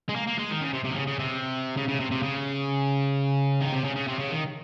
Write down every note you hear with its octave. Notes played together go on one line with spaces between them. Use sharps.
G#3
A#3
A#3
G#3
D#3
C#3
C3
C3
D#3
C#3
C#3
C3
C#3
C#3
C3
C3
C#3
D#3
C3
C#3
C#3
C3
C#3
D#3